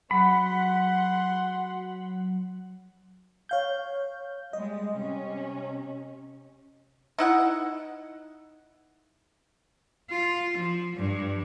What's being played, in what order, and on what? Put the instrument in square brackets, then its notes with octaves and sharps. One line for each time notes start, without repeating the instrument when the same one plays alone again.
[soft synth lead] F#3 [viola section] F#5 C6 [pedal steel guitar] B5
[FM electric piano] C#5 F5 G6
[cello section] G3 G#3 [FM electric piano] D#5
[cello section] C3 C#4
[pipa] D#4 E4 F#5
[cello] F4
F3
G2